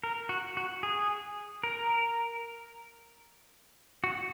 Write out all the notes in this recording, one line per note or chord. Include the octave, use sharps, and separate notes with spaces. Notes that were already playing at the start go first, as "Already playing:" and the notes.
A#4
F#4
F#4
G#4
A#4
F#4